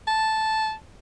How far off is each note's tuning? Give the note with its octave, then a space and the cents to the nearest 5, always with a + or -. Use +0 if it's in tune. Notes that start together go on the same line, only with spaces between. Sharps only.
A5 -5